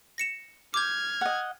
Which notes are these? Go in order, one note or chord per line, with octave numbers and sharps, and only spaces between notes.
A#6 C#7 E7
D6 F6 G6 G#6
D#5 F#5